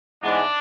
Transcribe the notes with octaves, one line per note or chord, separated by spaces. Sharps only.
G#2 E3 G#3 B3 D4